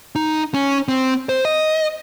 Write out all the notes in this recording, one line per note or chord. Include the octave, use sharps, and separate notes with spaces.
D#4
C#4
C4
C5
D#5